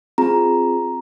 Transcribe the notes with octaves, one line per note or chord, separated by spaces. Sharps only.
C4 F4 G#4 A#5